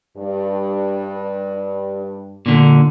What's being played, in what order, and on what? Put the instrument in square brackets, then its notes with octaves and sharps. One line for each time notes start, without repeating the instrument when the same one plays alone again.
[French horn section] G2
[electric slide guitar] A#2 D3